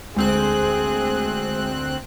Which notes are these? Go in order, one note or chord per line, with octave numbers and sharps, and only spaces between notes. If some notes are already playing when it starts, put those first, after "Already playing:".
D2 G#3 C4 G#4 F#6